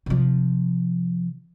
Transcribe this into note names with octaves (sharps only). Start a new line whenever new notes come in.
C3 F3